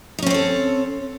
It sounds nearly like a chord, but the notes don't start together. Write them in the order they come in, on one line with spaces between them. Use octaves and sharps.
D#4 C#4 C4 C#5 A4